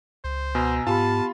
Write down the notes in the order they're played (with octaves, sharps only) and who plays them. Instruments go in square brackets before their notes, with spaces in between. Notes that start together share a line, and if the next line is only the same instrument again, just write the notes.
[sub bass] C#2 [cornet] C5
[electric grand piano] B2 [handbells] G#5 A#5 E6
[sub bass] G#2 [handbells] B3 G4 B5 [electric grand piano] F4 [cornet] A5